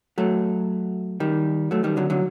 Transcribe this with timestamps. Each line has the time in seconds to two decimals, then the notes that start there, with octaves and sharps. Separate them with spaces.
0.18 F#3 A3
1.20 D#3 G3
1.71 F#3 A3
1.84 D#3 G3
1.97 D3 F#3
2.10 D3 F#3